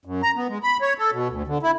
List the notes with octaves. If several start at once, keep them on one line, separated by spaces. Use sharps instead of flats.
F#2
A#5
B3
G#3
B5
C#5
A4
B2
D2
D3
E4